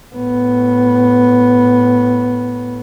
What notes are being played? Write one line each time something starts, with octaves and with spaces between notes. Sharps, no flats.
A2 B3